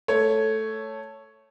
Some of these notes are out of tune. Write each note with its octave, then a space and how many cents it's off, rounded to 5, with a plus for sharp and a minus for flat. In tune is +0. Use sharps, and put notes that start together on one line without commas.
A3 +0 C#5 +0